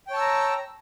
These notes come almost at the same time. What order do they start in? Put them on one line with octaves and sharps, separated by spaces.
G5 C#5 A5 E6 A#5